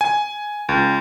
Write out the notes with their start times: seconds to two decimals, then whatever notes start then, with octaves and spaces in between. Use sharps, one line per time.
0.01 G#5
0.69 C#2